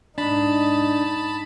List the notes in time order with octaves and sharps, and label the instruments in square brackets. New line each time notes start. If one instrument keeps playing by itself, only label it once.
[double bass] G#2 D#4 [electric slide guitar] D4 [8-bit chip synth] A5 B5